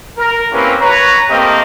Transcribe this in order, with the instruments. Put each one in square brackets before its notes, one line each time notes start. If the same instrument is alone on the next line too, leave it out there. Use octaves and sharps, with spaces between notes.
[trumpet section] A#4
A#3 C4 C#4 E4 G4 B4
B4 C#5 A#5
A3 A#3 C4 G4 A#4 D#5